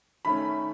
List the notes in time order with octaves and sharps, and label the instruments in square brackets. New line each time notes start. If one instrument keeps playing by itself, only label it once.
[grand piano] D#3 A3 C#4 [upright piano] B5